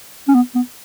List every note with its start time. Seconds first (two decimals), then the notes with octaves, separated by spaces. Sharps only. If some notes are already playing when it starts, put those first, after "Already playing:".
0.28 C#4
0.35 B3
0.55 B3